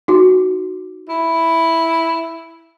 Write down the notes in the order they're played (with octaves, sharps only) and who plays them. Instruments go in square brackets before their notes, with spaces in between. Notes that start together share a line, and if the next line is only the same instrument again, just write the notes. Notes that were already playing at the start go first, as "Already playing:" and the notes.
[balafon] D#4 F#4
[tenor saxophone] E4